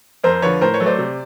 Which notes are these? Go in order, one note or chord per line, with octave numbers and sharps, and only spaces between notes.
F2 A#4 C5
D3 F3 B4 C#5
A2 A#4 C5
B4 C#5
F#3 A3
C5 D5
C3